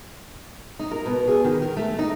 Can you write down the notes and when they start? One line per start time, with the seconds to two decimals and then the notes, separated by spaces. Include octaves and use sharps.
0.79 D#4
0.91 A#4
1.06 B2
1.27 G#4
1.44 D#3
1.62 A#4
1.77 A3
1.99 D#4